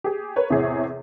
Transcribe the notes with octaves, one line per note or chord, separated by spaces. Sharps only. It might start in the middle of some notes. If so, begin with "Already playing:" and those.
G4 G#4
A#4 B4 C#5
E2 A2 C3 G#4 C#5